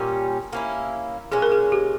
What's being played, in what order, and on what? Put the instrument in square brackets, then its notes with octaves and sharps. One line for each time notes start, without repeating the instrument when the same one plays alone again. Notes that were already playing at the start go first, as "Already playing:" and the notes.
Already playing: [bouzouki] A#2 G3 C#4
A#3 C#4 E4
[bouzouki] A#2 G#3 C#4 [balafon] G#4
[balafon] A#4
G#4
G4